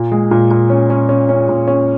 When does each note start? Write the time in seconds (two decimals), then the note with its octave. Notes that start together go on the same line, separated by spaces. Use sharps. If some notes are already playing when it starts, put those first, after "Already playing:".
Already playing: A#2
0.12 G#3
0.31 A#2
0.51 A#2
0.70 C#4
0.90 C#4
1.09 C#4
1.29 C#4
1.49 A#2
1.68 C#4